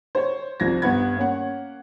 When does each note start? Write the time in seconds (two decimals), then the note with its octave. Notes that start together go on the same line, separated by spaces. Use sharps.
0.15 C5 C#5
0.60 C2 F3 G#6 A#6
0.82 G2 B3 F#5 B5 G#6
1.17 A#3 C#4 F#5